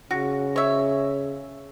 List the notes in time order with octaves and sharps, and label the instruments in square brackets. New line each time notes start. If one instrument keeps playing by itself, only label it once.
[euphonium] C#3 [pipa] F#4
[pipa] C#5 E5